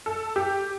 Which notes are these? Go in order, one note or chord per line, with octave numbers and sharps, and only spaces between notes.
A4
G4